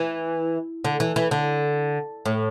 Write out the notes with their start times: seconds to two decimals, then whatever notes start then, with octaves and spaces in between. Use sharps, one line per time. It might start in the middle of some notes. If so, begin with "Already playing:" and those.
Already playing: E3
0.84 D3
1.00 E3
1.16 E3
1.31 D3
2.26 A2